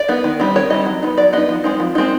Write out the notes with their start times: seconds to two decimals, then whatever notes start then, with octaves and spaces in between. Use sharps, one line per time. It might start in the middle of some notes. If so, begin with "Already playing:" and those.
Already playing: D5
0.08 B3 D#4
0.24 D#3
0.40 G3 C4 D#4
0.56 D#3 C#5
0.70 G3 C4 D#4 D#5
0.86 F#3
1.03 B3 D#4
1.18 F#3 D5
1.33 B3 D#4 D#5
1.49 F3
1.64 G#3 C4 D#4
1.80 F3
1.95 G#3 C4 D#4